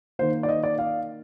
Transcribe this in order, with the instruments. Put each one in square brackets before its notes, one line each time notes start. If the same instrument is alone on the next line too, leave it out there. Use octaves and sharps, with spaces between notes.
[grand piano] D#3 A#3 C5
D5
D#5
D5
F5